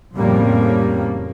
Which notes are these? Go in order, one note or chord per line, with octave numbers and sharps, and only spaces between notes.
F2 A2 C#3 G3 A#3